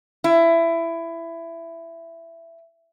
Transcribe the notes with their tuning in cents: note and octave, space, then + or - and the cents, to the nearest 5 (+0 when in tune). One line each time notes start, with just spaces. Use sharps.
E4 +15